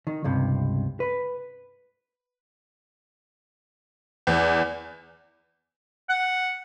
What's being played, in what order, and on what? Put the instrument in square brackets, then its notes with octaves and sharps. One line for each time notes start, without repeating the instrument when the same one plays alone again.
[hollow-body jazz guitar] D#3
C#2 G2 C3
B4
[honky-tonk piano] E2
[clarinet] F#5